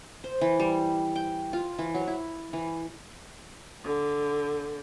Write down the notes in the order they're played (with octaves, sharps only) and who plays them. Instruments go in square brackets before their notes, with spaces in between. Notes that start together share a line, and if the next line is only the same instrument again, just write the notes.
[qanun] C5
E3
G3
G5
F4
E3
F#3
E4
E3
[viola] D3